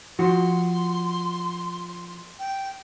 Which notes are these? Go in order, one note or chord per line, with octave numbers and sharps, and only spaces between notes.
F3 F#4 C6
G5